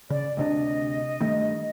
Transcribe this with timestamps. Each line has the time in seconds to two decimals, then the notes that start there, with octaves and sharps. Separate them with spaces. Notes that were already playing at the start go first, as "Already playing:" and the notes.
0.10 C#3 D5
0.37 D2 C3 D4 D#5
1.21 G2 D#3 A3